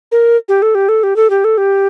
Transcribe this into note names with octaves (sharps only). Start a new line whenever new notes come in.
A#4
G4
A4
G4
A4
G4
A4
G4
A4
G4